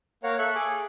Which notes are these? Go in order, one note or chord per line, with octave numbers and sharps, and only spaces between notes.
A#3 A#4 C#5 F5 F#5 A#5
A4 E5 C#6 F#6
G#4 G#5 D6
G#4